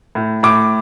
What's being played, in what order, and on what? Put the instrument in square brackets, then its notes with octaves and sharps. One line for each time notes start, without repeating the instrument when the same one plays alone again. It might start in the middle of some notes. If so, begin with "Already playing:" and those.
[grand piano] A2
A2 D6